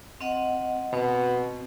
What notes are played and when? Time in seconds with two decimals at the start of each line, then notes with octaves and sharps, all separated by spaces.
0.21 C4 D#5 F#5
0.93 B2 C4